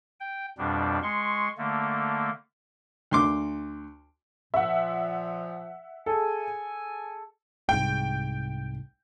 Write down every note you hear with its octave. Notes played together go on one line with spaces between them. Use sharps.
G5
F2 B2 G3 D4
G#3 C6 C#6
D3 A3 A#3
D2 C6 D6
A#2 F3 E5 F#5
G#4 A4 G#5
C2 G#2 G5